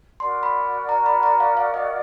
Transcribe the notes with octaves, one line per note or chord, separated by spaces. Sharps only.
F#4 A#4 D5 F#5 C6
B5
A#5
B5
A#5
F5
F5
D#5